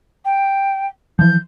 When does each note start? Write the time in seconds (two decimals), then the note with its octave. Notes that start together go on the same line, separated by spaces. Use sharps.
0.25 G5
1.19 E3 F3 G6